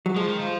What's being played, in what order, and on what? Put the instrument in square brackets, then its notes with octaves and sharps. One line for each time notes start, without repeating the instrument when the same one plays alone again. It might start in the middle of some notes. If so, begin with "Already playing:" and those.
[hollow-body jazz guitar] F#3
[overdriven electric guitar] F3 [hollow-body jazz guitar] G#3
[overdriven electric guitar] D#3
F3